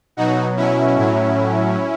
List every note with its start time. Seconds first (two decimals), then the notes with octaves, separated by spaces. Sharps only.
0.17 B2 F#3 D#4 F#4
0.57 C#4 E4
0.96 A2 F#3